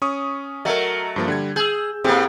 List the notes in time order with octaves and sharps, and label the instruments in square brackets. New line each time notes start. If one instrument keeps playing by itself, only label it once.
[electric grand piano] C#4 C#6 D#6
[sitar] F#3 A3 [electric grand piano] A#4 D#5
[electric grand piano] G2 F3 A#3
D3 G3 G#6
[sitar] G#4 [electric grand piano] E6 G6
[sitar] A2 A#3 [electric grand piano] C4 G4 G#4